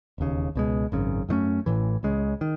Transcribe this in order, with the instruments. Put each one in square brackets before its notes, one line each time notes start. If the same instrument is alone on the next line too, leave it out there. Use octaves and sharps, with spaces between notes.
[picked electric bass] E1 D#2 C#3
C#2 B2 G#3
G#1 F#2 C#3
F#2 D#3 A3 C#4
A1 A2 E3
C#2 C#3 G#3
D#3